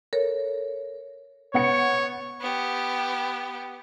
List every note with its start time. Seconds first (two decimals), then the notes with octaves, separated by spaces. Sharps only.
0.13 A4 A#4 C#5
1.54 B3 C#5 F#5 C#7
2.41 B3 G4